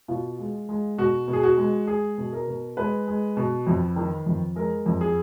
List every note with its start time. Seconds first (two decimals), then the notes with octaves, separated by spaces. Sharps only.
0.08 B2 F4
0.39 G#3
0.69 G#3
0.98 B2 F#4
1.28 B2
1.33 G#4
1.43 F#4
1.57 G#3
1.87 G#3 G#4
2.18 B2
2.33 A#4
2.47 B2
2.77 G#3 B4
3.08 G#3
3.37 B2
3.67 F2
3.96 D#3
4.26 F2
4.56 G#3 A#4
4.86 F2
5.01 G#4